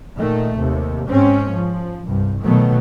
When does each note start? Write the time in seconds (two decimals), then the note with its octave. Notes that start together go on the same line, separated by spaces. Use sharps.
0.17 A#2 D#3 A3
0.59 D#2 C3
1.10 G#2 C4 C#4
1.52 F3
2.07 C2 G2
2.44 B2 D#3 F#3 A3 B3